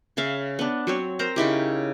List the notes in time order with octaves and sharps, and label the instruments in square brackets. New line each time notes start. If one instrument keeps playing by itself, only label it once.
[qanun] C#3 E5 F5
B3 D4
F#3 C4 C#5
C4 A#4 C5 A#5
C#3 D#4 E4 G4